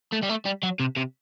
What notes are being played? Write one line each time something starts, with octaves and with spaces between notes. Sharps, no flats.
A3
G3
A3
G3
F#3
C3
C3